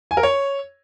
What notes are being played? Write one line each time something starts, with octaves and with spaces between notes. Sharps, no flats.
G#5
A#4
C#5